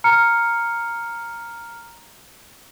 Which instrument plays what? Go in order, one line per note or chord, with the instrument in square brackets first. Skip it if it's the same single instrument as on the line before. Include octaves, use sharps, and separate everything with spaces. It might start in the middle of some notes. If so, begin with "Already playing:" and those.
[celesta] A#5 F6 C#7